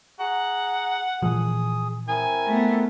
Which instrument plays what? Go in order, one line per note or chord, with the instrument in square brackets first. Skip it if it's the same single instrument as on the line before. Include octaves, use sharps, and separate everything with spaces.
[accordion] G#4 A#5 [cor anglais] F#5
[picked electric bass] A#2 E3 F3 [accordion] G#4 D#6
[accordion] C4 E4 A#4 [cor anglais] G#5
[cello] A3 B3